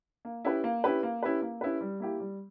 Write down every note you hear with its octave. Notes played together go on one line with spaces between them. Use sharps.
A#3
C#4 E4 G4 B4
A#3
C#4 E4 G4 B4
A#3
C#4 E4 G4 B4
A#3
C#4 E4 G4 B4
G3
A#3 E4 G4
G3